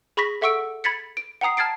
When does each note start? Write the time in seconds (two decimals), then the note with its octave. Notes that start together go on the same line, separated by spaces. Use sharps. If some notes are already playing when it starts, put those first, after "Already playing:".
0.17 G#4 B5 C#6 A#6 B6
0.41 A4 E5 F#5 C#6 E6 D7
0.84 B5 G#6 A6 B6 C#7
1.17 D7
1.41 F#5 G5 A#5 D#6 C7
1.57 A5 F6 G#6 A6 C7 D7